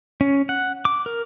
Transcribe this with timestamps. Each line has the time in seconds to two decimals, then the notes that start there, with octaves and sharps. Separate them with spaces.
0.21 C#4
0.49 F#5
0.85 D6
1.06 A#4